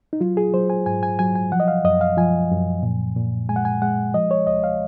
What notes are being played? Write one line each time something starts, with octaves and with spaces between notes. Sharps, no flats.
D#4
F#3 F4
G#4
F#3 C5
G#5
G#2 G#5
G#5
F#3 G#5
G#5
F3 F#5
D#5
F5
F#2 D#5
F5
F3 G#5
F#2
A#2
A#2
G#3 G#5
F#5
G#5
G#3 F#5
F3 D#5
C#5
C#2 D#5
F5